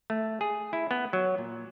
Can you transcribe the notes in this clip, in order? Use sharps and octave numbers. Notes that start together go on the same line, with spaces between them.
A3
G#4
E4
B3
F#3
A#2